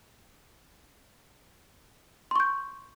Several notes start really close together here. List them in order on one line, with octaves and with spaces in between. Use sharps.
C6 C#6 G6